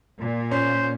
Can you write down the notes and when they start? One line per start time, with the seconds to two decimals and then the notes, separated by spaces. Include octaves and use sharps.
0.18 A#2
0.51 C#4 C5